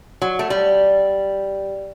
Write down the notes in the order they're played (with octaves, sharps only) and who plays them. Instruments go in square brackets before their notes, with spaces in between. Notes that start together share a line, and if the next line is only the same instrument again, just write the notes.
[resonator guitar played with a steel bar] F#3
A3
G3